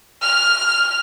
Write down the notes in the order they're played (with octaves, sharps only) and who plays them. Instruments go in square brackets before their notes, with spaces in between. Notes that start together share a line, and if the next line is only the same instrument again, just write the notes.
[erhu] F6